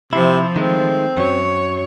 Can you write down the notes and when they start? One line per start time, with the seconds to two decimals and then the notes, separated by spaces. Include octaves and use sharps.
0.13 C3 F3 E4
0.56 D#3 G#3 A3 C4
1.17 F#2 F#3 C#5